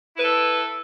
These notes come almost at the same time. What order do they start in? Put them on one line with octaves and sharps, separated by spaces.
E4 B4 A4